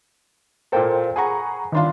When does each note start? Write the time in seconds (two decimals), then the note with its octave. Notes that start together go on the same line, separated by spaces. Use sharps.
0.72 A#2 A#3 A4 A#4 C5 G5
1.16 G#4 F#5 G#5 A#5 B5 C#6
1.72 G1 D#3 D4 F4 C6